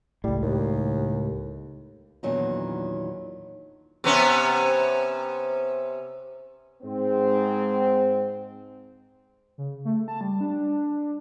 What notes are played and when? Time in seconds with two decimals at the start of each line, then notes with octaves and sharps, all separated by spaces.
0.24 C#2 A2 G3
0.42 D#2
2.23 E2 A#2 D#3 F#3 D4 D#4
4.04 C3 B3 C#4
6.83 G#2 C4
9.58 C#3
9.85 A3
10.08 A5
10.21 G3
10.41 D4